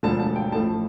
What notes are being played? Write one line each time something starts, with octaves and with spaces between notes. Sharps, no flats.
E1 D2 D3 F3 A5
A5
G5
A1 A2 F3 A3 A5